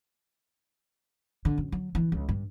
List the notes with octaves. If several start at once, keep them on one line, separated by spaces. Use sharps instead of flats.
D3
F#2
F#3
E3
C#2
G2